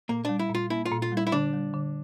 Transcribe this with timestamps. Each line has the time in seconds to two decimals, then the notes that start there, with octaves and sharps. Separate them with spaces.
0.09 A#2 A#3
0.25 G3 D4
0.39 E4
0.50 A#2 F4
0.70 A#3 E4
0.85 F4
0.92 A#2
1.02 F4
1.12 G3 E4
1.27 E4
1.32 D3 D4
1.53 G3
1.74 D3